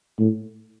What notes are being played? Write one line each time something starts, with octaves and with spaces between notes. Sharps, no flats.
A2